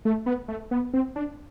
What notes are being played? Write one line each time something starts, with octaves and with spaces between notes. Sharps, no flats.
A3
B3
A3
B3
C4
D4